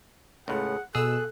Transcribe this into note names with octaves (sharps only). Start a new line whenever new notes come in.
C#2 A2 G#4 F#5
B2 G#4 A4 E6 F#6